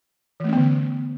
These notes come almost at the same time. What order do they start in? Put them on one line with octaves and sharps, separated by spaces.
E3 A3 C#4 B3 D3